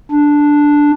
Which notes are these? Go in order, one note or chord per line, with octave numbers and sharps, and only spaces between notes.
D4